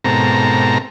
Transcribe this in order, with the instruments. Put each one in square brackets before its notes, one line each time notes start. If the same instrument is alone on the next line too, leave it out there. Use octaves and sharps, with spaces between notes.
[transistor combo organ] G#2 B2 C4 A4 A#4 A#5